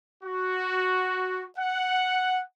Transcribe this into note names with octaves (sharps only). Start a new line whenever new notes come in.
F#4
F#5